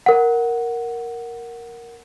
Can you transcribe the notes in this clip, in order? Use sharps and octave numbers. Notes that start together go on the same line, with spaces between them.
A#4 F#5